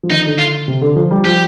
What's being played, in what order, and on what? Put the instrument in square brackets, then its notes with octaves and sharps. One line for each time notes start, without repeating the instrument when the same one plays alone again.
[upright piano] F3
[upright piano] D#3 [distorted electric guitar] D#4
[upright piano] D3
[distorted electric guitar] F4
[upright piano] C3
D3
F3
G3
[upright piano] F3 [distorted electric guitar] G4